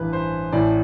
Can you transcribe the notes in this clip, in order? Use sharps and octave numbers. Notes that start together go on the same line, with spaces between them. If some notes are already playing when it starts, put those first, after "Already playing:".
Already playing: A1 G2 E3 B4
C5
A1 A2 E3 D5